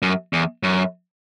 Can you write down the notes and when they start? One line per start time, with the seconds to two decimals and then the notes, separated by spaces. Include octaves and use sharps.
0.02 F#2
0.33 E2
0.63 F#2